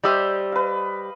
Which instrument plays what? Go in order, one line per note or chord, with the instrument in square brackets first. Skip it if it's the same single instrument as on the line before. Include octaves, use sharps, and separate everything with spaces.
[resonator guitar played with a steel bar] G3 G4 C5 [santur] D#5 E5 D#6
[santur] B4 F5